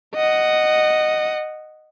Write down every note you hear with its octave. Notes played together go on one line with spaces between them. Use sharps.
D#5 F#5